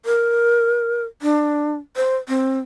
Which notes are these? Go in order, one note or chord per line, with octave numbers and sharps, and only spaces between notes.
A#4
D4
C5
C4